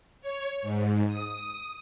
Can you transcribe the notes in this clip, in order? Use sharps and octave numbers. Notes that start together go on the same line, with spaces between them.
C#5
G#2
D#6